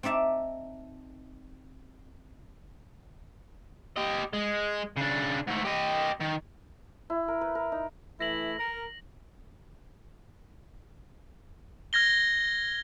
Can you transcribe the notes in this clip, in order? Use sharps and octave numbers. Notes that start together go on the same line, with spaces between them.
C4 D#4 D5 E5 A5
G4 D#5
G#3
C#3 D4
G#2 A3
G4 D#5
D#3
E4
A#4
B4
A#4
D#4
E3 A3 E4 A#6 F#7
A#4
F6 G#6 A#6 G7